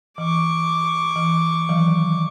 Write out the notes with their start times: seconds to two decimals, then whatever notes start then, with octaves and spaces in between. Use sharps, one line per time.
0.18 E3 C#6 D6
1.16 E3
1.69 D#3 E3 F#3